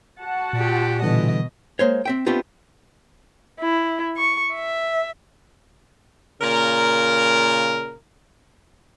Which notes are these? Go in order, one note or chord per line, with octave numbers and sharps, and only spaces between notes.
F#4 F#5 A5
A#2 F4 G4
B2 D3 E3 G3 D#5
G#3 A#3 C5 C#5
C4 E5 G5
A3 B3 C4 D4 F4 G4
E4
C#6
E5
A#2 C#3 A#4